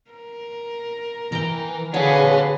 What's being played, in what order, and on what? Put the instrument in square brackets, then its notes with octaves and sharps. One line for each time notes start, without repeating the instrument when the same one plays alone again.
[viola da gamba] A#4
[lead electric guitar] E3 [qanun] G5 A#5
[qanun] D3 D4 [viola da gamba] F#4 G#4 B4 [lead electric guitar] C#5 F5